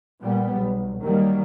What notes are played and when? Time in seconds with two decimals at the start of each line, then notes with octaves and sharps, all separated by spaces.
0.20 A#2 G3 B3
0.53 B1
1.01 D#2 D#3 F#3 G3 A#3